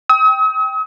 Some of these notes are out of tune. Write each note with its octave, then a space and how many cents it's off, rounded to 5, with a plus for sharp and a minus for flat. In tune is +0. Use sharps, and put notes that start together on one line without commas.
G5 +0 D#6 +45